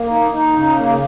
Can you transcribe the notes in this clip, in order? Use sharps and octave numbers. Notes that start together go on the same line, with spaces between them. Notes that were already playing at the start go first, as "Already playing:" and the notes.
Already playing: A#3
D#4
D#4
C#3
A#3